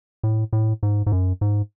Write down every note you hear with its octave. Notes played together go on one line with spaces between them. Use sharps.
A2
A2
G#2
G#2
F#2
G#2